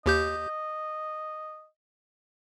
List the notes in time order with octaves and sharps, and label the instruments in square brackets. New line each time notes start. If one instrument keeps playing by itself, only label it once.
[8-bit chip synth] D#2 G4 G6 [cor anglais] D#5